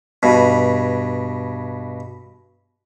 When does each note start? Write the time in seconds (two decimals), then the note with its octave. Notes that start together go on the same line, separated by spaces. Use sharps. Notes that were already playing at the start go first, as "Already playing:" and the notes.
0.23 G2 B2